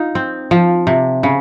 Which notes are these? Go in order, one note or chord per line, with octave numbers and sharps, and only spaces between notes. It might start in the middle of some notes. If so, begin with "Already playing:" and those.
Already playing: D#4 F4
C4
F3
C3
C#3